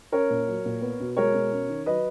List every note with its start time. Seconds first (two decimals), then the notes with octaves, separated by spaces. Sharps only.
0.12 C#4 A#4 C#5
0.30 A#2
0.48 F#3
0.65 A#2
0.81 B3
1.00 B2
1.17 G#3 A#4 C#5
1.35 B2
1.52 C#4
1.69 D#3
1.86 F#3 B4 D#5